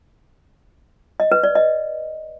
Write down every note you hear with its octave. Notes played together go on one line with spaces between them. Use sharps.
D#5
B4
D5
D#5